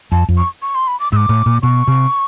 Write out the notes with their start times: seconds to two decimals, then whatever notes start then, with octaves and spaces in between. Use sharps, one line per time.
0.11 F2 A5
0.29 F2
0.37 C#6
0.62 C#6
0.75 C6
0.87 B5
1.00 D6
1.12 G#2 D6 E6
1.29 A2
1.46 A#2
1.62 B2 C#6
1.88 C3